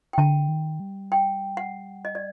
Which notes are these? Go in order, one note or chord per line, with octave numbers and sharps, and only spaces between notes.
G5
D3 A5
D#3
G3
G5
F#5
D#5
D5